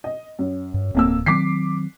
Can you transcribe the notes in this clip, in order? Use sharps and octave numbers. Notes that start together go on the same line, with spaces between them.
D#5
F#2
G2
D1 F2 A#3 E6
D#3 F#3 C4 D6 B6 C7